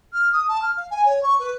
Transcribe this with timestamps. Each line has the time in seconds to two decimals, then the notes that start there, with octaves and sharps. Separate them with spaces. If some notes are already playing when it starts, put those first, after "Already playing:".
0.13 F6
0.32 D#6
0.48 A5
0.62 F6
0.77 F5
0.90 G#5
1.05 C#5
1.23 C#6
1.39 B4